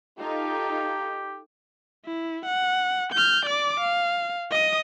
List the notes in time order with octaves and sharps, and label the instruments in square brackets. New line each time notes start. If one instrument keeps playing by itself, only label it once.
[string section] D#4 F4 A4 [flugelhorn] G4
[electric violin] E4
F#5
F6 G6
D5 D6
F5
D#5 D#6